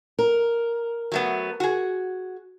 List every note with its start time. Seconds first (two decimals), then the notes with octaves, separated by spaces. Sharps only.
0.19 A#4
1.12 F#3 A3 B3
1.60 F#4 G#4